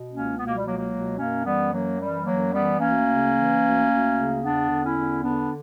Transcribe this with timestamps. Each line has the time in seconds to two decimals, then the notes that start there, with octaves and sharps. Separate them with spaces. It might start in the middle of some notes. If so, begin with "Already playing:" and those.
Already playing: B2
0.09 C#2 A#3 C#4
0.36 B2 B3
0.46 A#3
0.56 G3
0.64 C#2 F#3 A#3
0.77 F#3 A#3
0.91 B2
1.18 F#2 A#3 C#4
1.44 E3 G3 B3
1.72 F#2 F#3 A#3
1.99 E3 G3
2.25 F#2 F#3 A#3
2.53 E3 G3 B3
2.79 D2 A#3 C#4
3.06 C#3
3.33 E3
3.61 D2
3.88 D2
4.15 C#3
4.41 E2 B3 D4
4.69 D3
4.82 C#4 E4
4.95 E2
5.22 D3 B3 D4